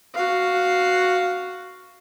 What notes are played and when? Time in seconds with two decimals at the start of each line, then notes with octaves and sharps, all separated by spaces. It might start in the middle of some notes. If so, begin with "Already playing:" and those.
0.15 F#4 F5